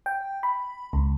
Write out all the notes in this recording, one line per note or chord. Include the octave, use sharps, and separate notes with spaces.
G5
B5
C#2